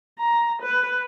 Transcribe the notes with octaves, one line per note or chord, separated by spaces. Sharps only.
A#5
B4